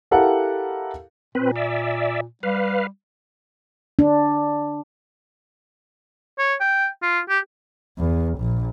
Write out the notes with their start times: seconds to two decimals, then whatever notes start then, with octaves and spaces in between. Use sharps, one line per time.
0.11 E4 G4 A4 A#4 F5 F#5
1.35 A#2 C4 B4
1.56 D5 E5
2.43 G3 B4 F5
3.99 D4
6.39 C#5
6.60 G5
7.02 F4
7.29 G4
7.99 E2
8.40 A#1